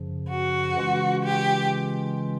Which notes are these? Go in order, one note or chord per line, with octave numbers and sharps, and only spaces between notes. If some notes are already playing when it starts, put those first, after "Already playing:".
Already playing: F#2 C#3 F3
F#4
C#3 E3 G#3 C#4 F4
G4